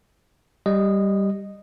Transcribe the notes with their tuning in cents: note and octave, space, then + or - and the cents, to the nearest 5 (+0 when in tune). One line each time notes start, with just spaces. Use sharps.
G3 +0 D#5 -10